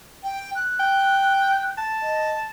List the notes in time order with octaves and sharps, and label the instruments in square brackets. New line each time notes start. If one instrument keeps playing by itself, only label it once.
[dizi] G5
F#6
[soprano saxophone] G5
A5
[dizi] D#5